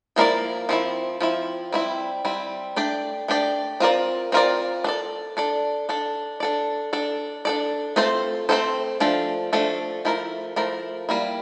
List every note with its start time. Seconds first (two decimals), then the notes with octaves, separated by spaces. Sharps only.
0.16 F3 A#3 E4 A#4 D5
0.69 F3 C4 E4
1.20 F3 C4 E4
1.72 G3 C4 E4
2.25 G3 C4 E4
2.76 A3 D4 G4 D5
3.28 A3 D4 G4 D5
3.80 C4 F4 A#4 D5
4.32 C4 F4 A#4 D5
4.84 D4 A4 D5
5.37 D4 A4 D5
5.89 D4 A4 D5
6.40 D4 A4 D5
6.93 D4 A4 D5
7.45 D4 A4 D5
7.96 A3 C4 F4 A4 C5
8.49 A3 C4 F4 A4 C5
9.00 F3 A3 D4 A4
9.53 F3 A3 D4 A4
10.05 F3 A3 E4 A#4
10.56 F3 A3 E4 A#4
11.09 G3 A#3 E4